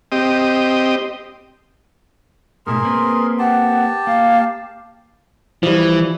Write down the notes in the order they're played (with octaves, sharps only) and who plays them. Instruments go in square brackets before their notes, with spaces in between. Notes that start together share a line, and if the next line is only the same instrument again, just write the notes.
[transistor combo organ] C4 G4 D#5
[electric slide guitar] G#2 B2 A3 [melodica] G#4 A#4 [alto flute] C6
[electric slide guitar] A#3 C4 B4
[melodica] G4 A5 [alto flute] F#5
[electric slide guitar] A#3 [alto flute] F5
[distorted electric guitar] E3 [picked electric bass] F3 G3